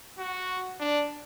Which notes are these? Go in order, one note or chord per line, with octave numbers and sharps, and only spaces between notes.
F#4
D4